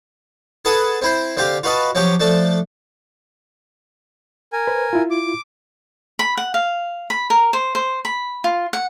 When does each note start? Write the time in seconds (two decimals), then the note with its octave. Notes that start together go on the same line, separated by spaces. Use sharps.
0.65 G#4 A4 B4 F#5 A5 D#6
1.02 C4 E4 C5
1.37 D3 C4 F4 G4
1.63 F4 F#4 B4 D#5 A5
1.95 F3 F#3 C4 C#4 G4
2.20 F3 A3 D4 A4
4.53 A#4 G#5
4.67 B4 C5
4.93 E4 F4
5.10 D6
6.19 B5
6.37 F#5
6.54 F5
7.10 B5
7.30 A#4
7.53 C5
7.75 C5
8.05 B5
8.44 F4
8.73 F#5